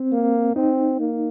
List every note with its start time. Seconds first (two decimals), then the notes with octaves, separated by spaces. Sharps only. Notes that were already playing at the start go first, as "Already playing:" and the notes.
Already playing: C4
0.12 A#3
0.55 C4 D#4
1.00 A#3